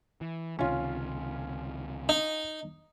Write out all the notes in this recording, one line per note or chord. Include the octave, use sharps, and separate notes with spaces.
E3
C#2 C3 D#3 C#4 F4
D#4